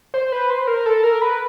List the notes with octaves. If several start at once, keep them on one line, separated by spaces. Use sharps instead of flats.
C5
B4
C5
A#4
A4
A#4
B4